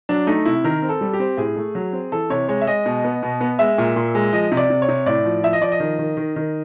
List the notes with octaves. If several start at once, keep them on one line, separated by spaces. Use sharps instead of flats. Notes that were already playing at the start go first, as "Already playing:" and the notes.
F#3 D4
A3 D#4
C3 E4
D#3 A#4
C4
A4
G3
G4
C4
A2 G#4
A3
F#3
C4
E3 A4
C3 C#5
G#3 C#5
E5
G#3 D#5
B2
B3
B2
B3
G#3 E5
A#2
A#2
G#3
F3 D#5
C3
D5
C3
C#5
C3
A2 D5
F3
F3 E5
D#5
F3 D5
D#5
D#3
D#3
D#3
D#3